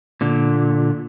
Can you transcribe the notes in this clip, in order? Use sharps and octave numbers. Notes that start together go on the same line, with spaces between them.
A#2 D3